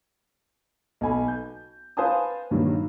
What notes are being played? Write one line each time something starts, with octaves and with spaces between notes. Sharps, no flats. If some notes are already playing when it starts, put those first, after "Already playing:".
B1 A4 G#5 B5
G6
B4 C5 F5 G#5 A5 D#6
G2 A#2 D#3 F#3